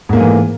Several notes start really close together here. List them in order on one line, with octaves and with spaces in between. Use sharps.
G#2 A#3 A3 E3